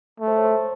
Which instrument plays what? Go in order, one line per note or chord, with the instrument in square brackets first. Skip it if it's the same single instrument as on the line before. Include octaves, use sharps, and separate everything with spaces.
[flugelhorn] A3
[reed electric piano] C5
C#5
C5